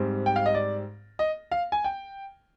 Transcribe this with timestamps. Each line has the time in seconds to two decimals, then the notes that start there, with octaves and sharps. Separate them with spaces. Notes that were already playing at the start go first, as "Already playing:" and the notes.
Already playing: G#2 G3 C4
0.26 G5
0.36 F5
0.46 D#5
0.55 D5
1.19 D#5
1.51 F5
1.72 G#5
1.84 G5